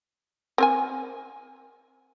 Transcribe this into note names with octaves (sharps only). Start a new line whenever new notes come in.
C4 A#4 G#5